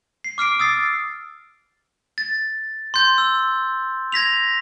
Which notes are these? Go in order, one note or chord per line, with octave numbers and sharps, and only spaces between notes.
C7
D6 F6 C7 D7
D#6 E6 A6 C7
A6
C6 G6
E6
G#6 A#6 B6 F7